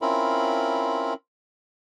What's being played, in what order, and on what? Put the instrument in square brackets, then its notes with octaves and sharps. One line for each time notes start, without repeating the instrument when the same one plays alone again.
[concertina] C4 C#4 E4 F4 A#4 B5